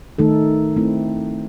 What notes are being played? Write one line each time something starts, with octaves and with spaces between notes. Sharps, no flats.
D#3 A3 D#4 A4
A3 C4 E4